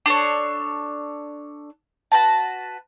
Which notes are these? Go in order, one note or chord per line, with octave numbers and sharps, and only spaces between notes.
D4 A4 C#5
F#4 B4 A5